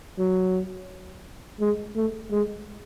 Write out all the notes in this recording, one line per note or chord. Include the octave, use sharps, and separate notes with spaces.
F#3
G#3
A3
G#3